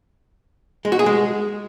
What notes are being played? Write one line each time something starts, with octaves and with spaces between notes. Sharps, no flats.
G#3
F#4
G#4
G#3